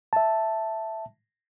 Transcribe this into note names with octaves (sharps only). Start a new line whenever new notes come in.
E5 A5